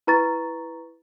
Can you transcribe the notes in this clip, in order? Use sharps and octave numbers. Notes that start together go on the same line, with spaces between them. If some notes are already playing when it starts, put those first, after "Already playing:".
E4 B4 A#5 C#6 A6